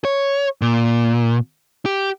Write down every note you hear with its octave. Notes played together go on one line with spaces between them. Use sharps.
C#5
A#2
G4